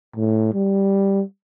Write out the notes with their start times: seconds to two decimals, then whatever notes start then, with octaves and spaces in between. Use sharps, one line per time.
0.16 A2
0.54 G3